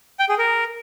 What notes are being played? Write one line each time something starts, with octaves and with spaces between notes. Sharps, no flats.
G5
G#4
A#4